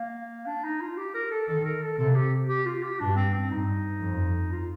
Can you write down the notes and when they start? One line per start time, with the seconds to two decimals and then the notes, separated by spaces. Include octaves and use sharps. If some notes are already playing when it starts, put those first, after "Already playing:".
Already playing: A#3
0.46 D4
0.64 D#4
0.81 F4
0.97 G4
1.14 A#4
1.31 A4
1.48 D#3 A4
1.64 A#4
1.82 A4
1.98 C3 A4
2.15 G4
2.49 G4
2.66 F4
2.83 G4
3.00 G2 D4
3.16 C4
3.34 C4
3.50 G2 D#4
4.01 F2
4.52 F4